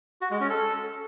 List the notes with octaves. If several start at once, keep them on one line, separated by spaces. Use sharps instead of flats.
F#4
G#3
C#4
A4